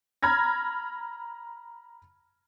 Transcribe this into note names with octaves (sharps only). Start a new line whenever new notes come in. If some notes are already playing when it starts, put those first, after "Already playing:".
A#5 B5 F6 G#6 A#6